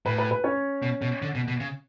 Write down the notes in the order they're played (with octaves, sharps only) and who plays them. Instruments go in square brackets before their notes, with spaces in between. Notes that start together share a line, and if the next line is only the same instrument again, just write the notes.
[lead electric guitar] A2 [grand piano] B4
[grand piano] B4
B4
C#4 C#5
[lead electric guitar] B2
B2
D3
B2
B2
C#3